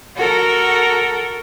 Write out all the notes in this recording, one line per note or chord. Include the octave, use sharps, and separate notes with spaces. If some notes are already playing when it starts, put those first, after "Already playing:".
F#4 A4 A#4